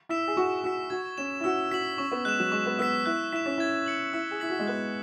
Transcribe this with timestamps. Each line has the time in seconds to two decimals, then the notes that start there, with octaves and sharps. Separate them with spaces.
0.09 E4 E6 B6 E7
0.28 G#4
0.37 F#4 C#6
0.64 F#4 E6 B6
0.90 F#4 G#6
1.18 C#4 E7
1.41 E4
1.44 F#4 E6
1.71 F#4 B6 F#7
1.98 C#4 C#6
2.12 B3
2.25 G#3 F#6 E7
2.39 F#3
2.52 G#3 C#6
2.66 B3
2.79 B3 E6 B6
3.06 E4 F#6
3.33 E4 B6 E7
3.46 C#4
3.58 E4 G#6
3.86 C#7 F#7
4.13 E4 E6
4.31 G#4
4.40 E4 B6 F#7
4.50 F#4
4.59 G#3
4.67 B3 F#6